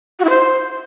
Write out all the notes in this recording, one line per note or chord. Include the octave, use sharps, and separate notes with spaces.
F#4
E4
C5